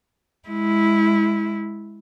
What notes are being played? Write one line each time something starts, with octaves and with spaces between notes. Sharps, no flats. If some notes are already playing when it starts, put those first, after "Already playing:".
G#3 E4